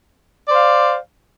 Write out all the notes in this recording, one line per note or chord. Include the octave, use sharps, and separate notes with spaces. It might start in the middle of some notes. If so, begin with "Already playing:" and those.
C5 D5 F5